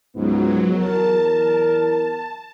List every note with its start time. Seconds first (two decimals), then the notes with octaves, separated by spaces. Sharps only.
0.15 C#2 G#2 F#3 B3
0.77 E2 A#4 A5